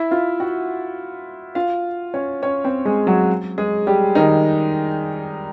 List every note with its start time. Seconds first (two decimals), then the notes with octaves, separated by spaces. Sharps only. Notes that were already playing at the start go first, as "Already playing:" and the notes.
Already playing: E4 E5
0.11 F4 F5
0.40 F#4 F#5
1.55 F4 F5
2.14 C#4 C#5
2.42 C#4 C#5
2.64 C4 C5
2.85 G#3 G#4
3.07 F#3 F#4
3.58 G#3 G#4
3.87 G3 G4
4.15 D#3 D#4